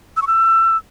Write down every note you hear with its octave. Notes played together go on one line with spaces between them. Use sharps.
E6
C#6
E6